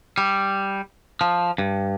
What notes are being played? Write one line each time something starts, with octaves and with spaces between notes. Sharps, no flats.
G3
F3
G2